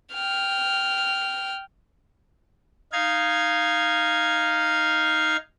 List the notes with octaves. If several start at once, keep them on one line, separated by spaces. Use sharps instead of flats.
G5 F6
D#4 F5 G#6